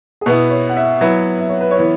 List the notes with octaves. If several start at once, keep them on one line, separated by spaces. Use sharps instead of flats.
G#4
B2 B3 E4 B4
C#5
F#5
E5
F#3 B3 E4 B4
E5
C#5
B4
C#5
E3 B3 E4